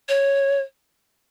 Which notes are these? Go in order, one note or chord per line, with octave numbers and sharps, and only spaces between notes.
C#5